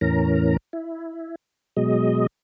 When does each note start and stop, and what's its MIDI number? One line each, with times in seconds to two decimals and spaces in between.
0.01 0.57 40
0.01 0.57 45
0.01 0.57 52
0.01 0.57 61
0.01 0.57 70
0.01 0.57 82
0.73 1.35 64
1.77 2.27 47
1.77 2.27 54
1.77 2.27 56
1.77 2.27 75